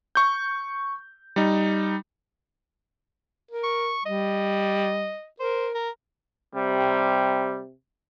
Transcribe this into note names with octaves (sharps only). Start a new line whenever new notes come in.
C#6 G6
G3 D#4
A#4
C#6
G3 D#5
A#4 C5
A#4
C3 G3